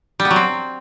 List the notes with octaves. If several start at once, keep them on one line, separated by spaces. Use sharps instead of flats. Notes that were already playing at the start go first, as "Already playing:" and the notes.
G3
B3
F#3
C4